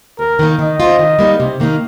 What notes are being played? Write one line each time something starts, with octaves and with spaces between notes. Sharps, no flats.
D#2 A#4
D#3 A#3 D#4
D#3 D#5
C4 F4
D#3
G3 A#3 D#4
C3
D#3 A#3 D#4